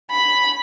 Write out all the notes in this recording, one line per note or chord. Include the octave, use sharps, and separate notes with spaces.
B5